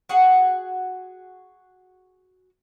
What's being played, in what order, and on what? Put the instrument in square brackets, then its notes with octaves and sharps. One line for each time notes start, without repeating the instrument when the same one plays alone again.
[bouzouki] F#4 G#4 F#5